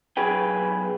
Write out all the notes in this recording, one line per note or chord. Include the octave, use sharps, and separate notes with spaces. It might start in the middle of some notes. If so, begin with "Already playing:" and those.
B1 G#4 B4 G5